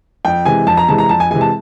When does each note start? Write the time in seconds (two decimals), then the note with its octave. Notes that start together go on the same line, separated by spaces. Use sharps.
0.25 F2 G5
0.45 C3 E3 G#3 G#5
0.67 F2 A5
0.77 A#5
0.88 C3 E3 G#3 A5
0.98 A#5
1.09 F2 A5
1.20 G#5
1.31 C3 E3 G#3 G#5
1.41 A5